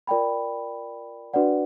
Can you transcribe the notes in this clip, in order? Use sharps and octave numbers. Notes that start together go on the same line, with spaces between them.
F4 A#4 D5 G5 B5
D4 F#4 B4 D5 F#5